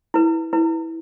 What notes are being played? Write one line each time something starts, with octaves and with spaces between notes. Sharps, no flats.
E4 B4
E4 B4